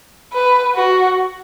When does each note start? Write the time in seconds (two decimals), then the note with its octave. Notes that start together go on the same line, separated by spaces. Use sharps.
0.33 B4
0.75 F#4